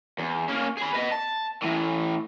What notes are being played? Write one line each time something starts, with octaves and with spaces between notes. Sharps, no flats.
E2
A#3 C#4
G#4 B5
B4 D#5
A5
A2 E3